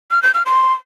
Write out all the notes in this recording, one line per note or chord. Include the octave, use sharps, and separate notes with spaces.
F6
G6
F6
C6